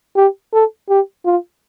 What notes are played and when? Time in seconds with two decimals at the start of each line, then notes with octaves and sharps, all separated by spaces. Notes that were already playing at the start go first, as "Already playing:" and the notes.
0.16 G4
0.53 A4
0.89 G4
1.25 F4